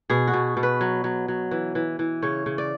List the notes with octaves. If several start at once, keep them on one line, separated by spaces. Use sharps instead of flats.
B2 G#4
F#4
B2
B2
B4
F#3
F#3
F#3
E3
E3
E3
C#3 C#5
C#3
D5